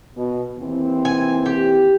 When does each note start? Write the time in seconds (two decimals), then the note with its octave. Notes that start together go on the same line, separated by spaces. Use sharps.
0.15 B2
0.58 D#2 E3 C4
1.05 G#5
1.46 G4